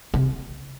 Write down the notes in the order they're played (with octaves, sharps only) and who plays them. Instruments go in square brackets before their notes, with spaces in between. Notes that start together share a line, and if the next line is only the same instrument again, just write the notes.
[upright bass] C3